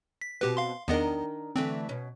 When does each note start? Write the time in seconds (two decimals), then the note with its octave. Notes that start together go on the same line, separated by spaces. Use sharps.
0.21 B6
0.41 B2 C4 F#4 G4 B4
0.57 F5 C6
0.88 E2 D#3 B3 D4 A#4 D#5
1.56 D3 E3 A3 C4
1.89 B2 C#4